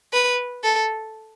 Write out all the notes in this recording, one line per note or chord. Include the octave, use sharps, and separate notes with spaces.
B4
A4